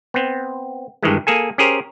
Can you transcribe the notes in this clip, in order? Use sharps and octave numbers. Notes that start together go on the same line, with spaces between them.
B3 C4
G2 D#3 E3 G#3
A#3 G#4 A4 G#5
C#4 G4 G#4 A#4 C5